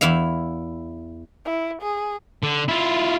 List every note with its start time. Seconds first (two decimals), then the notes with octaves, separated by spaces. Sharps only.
0.01 E2 E4 E5 F5
1.45 E4
1.82 G#4
2.44 D3
2.69 E4 F4